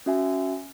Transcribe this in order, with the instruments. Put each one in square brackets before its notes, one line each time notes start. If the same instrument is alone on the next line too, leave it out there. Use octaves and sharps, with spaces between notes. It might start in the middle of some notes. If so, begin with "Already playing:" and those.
[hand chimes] C#4 F#4 E5 G#5